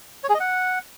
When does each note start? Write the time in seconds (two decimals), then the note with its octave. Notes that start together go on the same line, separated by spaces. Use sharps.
0.24 C#5
0.29 G#4
0.35 D#5
0.40 F#5